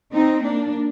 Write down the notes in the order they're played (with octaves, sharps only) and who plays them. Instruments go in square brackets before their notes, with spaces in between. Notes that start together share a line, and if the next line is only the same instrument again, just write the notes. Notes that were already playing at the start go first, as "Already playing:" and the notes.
[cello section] C4 D#4
A#3 D4